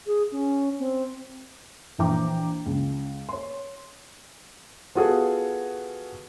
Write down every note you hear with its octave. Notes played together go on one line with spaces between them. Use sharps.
G#4
C#4
C4
A#1 E3 G5 A#5 D6
C#2
C#5 C6
B3 F4 F#4 G#4 A4